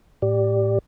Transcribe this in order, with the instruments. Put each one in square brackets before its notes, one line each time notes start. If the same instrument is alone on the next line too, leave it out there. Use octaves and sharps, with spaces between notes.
[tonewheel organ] A2 G4 D5